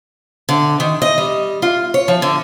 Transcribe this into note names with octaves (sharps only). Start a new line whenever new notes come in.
D3
D#3
D#5
G3
F4
C#5
F3
D3